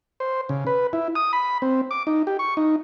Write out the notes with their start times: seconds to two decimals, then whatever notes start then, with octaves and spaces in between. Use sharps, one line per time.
0.20 C5
0.49 C#3
0.67 B4
0.93 E4
1.15 D#6
1.33 B5
1.62 C4
1.91 D6
2.07 D#4
2.27 G4
2.39 C#6
2.57 D#4